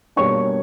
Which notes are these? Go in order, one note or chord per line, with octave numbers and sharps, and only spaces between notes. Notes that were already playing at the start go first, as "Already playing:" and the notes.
B2 G3 A#3 D4 C#5 C#6